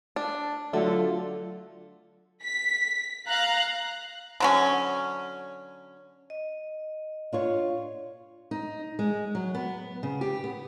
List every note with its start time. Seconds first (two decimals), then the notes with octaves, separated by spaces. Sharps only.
0.16 D4
0.73 D3 F#3 A3 F4 A4
2.43 B6
3.27 F5 A#5 F#6
4.40 D3 F#3 C#4
6.30 D#5
7.33 D4 F4 C#5
8.51 D#4
8.99 G#3
9.35 F#3
9.55 B3
10.03 C#3
10.21 G4
10.44 B3